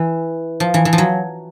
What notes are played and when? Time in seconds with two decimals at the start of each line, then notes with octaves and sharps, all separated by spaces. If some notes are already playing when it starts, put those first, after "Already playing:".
Already playing: E3
0.60 F3
0.74 E3
0.85 E3
0.93 F3
0.98 F#3